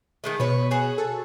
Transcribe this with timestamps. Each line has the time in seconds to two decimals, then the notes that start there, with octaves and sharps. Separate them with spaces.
0.24 D#3 G#3 A3
0.40 B2 B4 C#5
0.71 F#4 G#4 C#5
0.98 A4